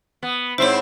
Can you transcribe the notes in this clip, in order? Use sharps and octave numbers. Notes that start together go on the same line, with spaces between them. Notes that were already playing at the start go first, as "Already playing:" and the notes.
B3
G#2 C4 E4 C5 C#5